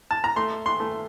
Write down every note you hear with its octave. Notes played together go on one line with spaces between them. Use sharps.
A5
A#5
A3 C6
C6
A3